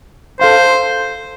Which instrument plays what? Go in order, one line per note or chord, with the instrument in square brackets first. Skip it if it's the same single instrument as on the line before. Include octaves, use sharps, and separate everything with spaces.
[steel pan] A4 F5 C6 [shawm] C5